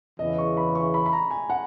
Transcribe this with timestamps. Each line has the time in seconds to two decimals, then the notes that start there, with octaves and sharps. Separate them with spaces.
0.19 E2 C#3 E3 D#5
0.38 C#6
0.57 B5
0.75 C#6
0.94 B5
1.06 B5
1.13 A#5
1.31 G#5
1.50 F#5